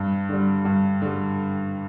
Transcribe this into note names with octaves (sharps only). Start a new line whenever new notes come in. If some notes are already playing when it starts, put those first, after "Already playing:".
Already playing: G2
D3 G3
G2
D3 G3